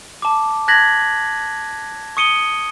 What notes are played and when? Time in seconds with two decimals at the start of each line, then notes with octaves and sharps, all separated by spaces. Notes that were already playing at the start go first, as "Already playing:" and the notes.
0.22 A5 D6
0.68 A5 F#6 G#6 A#6 B6 F#7
2.17 C#6 D#6 C#7 D#7 G7